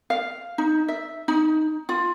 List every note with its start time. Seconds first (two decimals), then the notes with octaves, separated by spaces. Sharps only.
0.10 F5
0.58 D#4
0.88 E5
1.28 D#4
1.89 F4